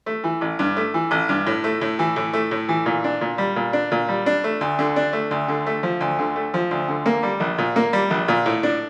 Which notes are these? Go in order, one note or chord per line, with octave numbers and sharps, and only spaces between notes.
A3
E3
A1
G2
A3
E3
A1
G2
A2
A3
A2
E3
A2
A3
A2
E3
A#2
D4
A#2
G3
A#2
D4
A#2
G3
D4
A3
D2
D3
D4
A3
D2
D3
A3
F3
D2
D3
A3
F3
D2
D3
A#3
G3
A#1
A#2
A#3
G3
A#1
A#2
A2
D4